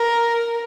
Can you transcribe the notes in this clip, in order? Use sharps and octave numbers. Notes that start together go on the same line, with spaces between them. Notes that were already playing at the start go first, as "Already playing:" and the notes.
Already playing: A#4